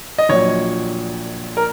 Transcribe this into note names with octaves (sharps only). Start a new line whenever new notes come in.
D#5
A#1 A#2 F#3 C#5
A#4